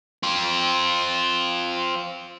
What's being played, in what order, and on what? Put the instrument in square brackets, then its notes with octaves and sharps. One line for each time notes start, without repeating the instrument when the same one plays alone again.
[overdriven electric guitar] C4 F4